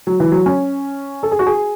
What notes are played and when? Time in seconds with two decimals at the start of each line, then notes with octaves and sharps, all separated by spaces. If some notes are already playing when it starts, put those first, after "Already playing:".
0.07 F#3
0.20 E3
0.32 F#3
0.46 C#4
1.23 A4
1.31 G#4
1.39 F#4
1.46 G#4